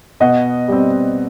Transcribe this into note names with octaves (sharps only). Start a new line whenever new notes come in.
B2 D#5 F#5
G3 C4